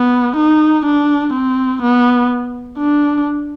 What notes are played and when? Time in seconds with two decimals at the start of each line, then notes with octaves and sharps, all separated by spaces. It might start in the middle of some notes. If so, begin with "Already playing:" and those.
Already playing: B3
0.37 D#4
0.86 D4
1.33 C4
1.82 B3
2.78 D4